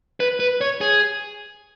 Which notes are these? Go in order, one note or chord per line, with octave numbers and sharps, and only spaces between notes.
B4
B4
C#5
G#4